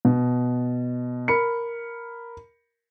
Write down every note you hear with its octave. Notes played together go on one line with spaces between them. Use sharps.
B2
A#4 B5 C#7